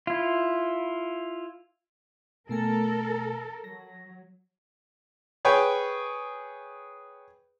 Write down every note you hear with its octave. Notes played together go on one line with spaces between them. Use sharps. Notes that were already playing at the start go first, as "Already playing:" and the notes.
E4 F4
B2 A3 A4 A#4 G#5
F#3 A#6
G#4 B4 C#5 G5